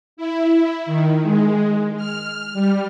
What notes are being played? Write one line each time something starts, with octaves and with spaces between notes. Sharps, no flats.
E4
D#3
G#3
F6
G3